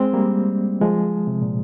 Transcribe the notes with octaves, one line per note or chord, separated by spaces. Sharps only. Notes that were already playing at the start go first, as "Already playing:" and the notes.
Already playing: G#3 C4
G3 A#3
F3 G#3
C3
A#2